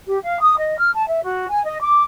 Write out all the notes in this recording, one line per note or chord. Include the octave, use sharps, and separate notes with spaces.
G4
F5
D#6
D#5
F6
A5
E5
F#4
G#5
D#5
D6